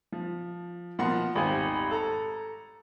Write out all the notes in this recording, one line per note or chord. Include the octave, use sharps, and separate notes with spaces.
F3
B2 F3 A#3 F#5 C6
D#1 G#1 G4 C5 G#5
A4 A#5